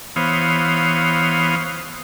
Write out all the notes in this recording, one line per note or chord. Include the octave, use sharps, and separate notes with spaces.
E3 B3 C5 C#5 F5 D#6